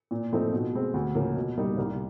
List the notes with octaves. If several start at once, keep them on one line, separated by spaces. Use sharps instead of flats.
A#2
F3 A3 C4 D#4
B2
G#3 C4
D2
C#3 F3 A#3
B2
G3 A#3 D#4
C2